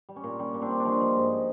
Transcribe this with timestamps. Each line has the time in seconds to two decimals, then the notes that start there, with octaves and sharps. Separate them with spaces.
0.09 G3
0.16 C#4
0.24 A#2
0.39 G3 C#4
0.54 A#2
0.62 C4 D4
0.70 G3
0.80 D4
0.85 F3 C#4 D#4
1.01 F3
1.16 G#2